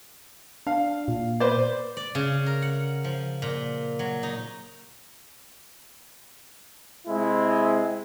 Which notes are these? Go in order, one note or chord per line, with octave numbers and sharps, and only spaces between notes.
D4 F5
A#2
B4 C5 D5
D5
C#3
A#4
F#5
F3
A#2
F#3
D#4
C3 G#3 C4 E4